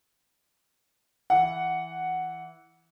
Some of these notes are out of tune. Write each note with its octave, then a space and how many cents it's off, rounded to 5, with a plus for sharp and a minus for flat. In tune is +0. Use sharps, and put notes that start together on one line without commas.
E3 +0 F#5 +0